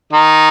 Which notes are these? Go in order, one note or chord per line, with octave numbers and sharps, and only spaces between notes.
D#3 D#4